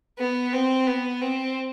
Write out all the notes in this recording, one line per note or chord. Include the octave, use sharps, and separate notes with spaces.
B3
C4
B3
C4